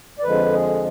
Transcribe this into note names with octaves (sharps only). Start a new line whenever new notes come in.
D5
F2 D3 F3 G#3 B4
G#4